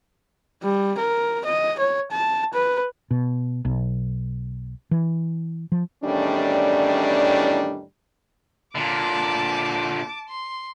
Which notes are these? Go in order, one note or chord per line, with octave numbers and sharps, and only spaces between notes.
G3
A#4
D#5
C#5
A5
B4
B2
B1
E3
F3
E2 A2 D#3 G3 C#4 D4
A#2 D3 A5 D6
C6